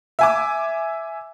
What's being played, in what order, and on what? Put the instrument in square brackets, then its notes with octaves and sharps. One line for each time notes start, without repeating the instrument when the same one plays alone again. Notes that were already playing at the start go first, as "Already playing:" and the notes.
[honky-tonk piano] E5 G#5 D6